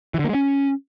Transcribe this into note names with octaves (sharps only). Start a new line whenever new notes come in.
E3
D3
A#3
G#3
C#4